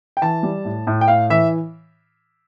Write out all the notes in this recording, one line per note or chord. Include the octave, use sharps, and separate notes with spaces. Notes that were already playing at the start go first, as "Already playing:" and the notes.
G5
E3 A5
G3
A2
A2
G5
A2 F5
E3 E5